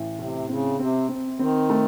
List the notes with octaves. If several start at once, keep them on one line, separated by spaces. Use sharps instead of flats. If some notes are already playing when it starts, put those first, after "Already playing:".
Already playing: A1
A2 C3
C#3 C4
C3 C4
C4
D#3 C4
A3